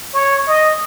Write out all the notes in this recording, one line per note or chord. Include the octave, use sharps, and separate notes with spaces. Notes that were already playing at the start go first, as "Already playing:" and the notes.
C#5
D#5